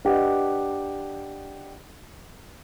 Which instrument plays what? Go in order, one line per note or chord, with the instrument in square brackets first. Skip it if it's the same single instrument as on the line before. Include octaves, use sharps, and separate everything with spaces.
[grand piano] D4 G4 B4 D#5 F#5